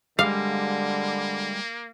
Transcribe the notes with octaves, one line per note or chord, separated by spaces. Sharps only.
D3 G3 G#3 A#3 F5